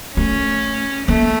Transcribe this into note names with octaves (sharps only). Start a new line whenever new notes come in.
A3 C#4
A3 A#3